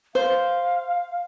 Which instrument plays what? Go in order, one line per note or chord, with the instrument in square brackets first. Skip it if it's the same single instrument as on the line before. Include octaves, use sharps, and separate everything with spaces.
[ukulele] C5 [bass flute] F5